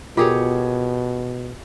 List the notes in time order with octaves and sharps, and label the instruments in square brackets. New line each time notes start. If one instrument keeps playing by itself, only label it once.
[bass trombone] B2 [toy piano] F4 A#4 [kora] G4 G#4 C#5